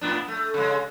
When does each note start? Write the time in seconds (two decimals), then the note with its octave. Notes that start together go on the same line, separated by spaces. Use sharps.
0.01 A2 B3 D4
0.28 A3
0.54 C#3 G#3